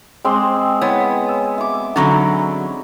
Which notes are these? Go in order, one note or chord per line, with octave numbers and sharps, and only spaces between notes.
G#3 C4 G5 C6 D6
B3 E4 C#5 G5
G#5 E6
E5 D6
D3 F#3 C#4 D#4 B5